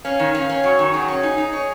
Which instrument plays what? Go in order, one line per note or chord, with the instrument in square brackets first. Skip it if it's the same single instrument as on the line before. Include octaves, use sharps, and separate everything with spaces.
[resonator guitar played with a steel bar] C#4 [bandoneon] F5
[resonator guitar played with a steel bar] D#3
[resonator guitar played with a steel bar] C#4 [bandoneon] F5
[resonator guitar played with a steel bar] C#4
[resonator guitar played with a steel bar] F#3 [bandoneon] C#5
[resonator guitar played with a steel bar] D#3
[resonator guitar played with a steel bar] F#3 [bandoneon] G#4
[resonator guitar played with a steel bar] C#4
D#4
D#4
C#5